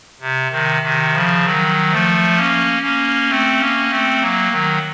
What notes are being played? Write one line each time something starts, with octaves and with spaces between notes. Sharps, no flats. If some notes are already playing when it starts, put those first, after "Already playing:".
C3
C3 D#3
C3 D#3
C#3 F3
D#3 F#3
F3 A3
A#3 C#4
A#3 C#4
A3 C4
A#3 C#4
A3 C4
F#3 A#3
D#3 F#3